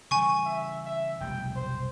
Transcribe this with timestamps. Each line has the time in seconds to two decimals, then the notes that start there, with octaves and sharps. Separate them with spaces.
0.11 C#3 E3 G3 G#5 C#6
0.45 E5
0.85 E5
1.20 F1 B1 G3 G5
1.56 C5